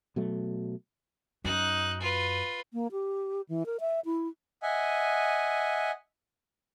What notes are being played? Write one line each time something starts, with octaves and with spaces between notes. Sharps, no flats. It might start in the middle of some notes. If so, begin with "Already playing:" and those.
B2 F#3 A3
F#2 D#4 F#6
F4 B4
A#3
G4
E3
A#4
E5
E4
D#5 E5 F#5 G#5